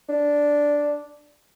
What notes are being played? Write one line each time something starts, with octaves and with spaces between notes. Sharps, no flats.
D4